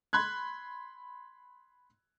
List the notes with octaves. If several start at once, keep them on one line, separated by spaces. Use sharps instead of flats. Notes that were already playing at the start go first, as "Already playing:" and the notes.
B5 C6 F#6 G#6